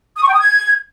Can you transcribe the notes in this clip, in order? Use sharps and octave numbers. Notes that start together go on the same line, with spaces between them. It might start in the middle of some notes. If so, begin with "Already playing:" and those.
D#6
C#6
G5
D#6
G#6